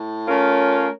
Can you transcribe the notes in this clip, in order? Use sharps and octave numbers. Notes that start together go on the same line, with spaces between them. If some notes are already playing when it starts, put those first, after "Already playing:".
Already playing: A2
A3 C#4 F4 A#4 C#5